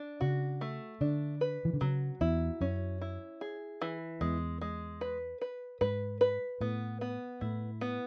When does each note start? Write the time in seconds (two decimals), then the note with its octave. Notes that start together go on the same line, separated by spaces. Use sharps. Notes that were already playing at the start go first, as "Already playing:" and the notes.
Already playing: D4
0.21 C#3 F#4
0.61 A3
1.01 D3 D4
1.41 B4
1.65 E3
1.73 D3
1.81 C#3 F#3
2.21 E2 E4
2.61 F#2 C#4
3.01 E4
3.41 G#4
3.81 E3
4.21 E2 G#3
4.61 G#3
5.01 B4
5.41 B4
5.81 G#2 B4
6.21 B4
6.61 A2 B3
7.01 B3
7.41 A2 E4
7.81 B3